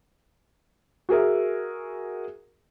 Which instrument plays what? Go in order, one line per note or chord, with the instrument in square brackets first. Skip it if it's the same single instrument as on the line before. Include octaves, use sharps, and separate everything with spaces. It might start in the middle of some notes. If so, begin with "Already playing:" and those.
[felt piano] F#4 G#4 A#4 E5